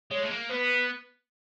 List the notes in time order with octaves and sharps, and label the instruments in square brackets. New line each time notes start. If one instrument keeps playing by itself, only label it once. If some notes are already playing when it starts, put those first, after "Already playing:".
[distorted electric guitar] G#3 [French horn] C#5
[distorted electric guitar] A3
A#3
[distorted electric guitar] B3 [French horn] B4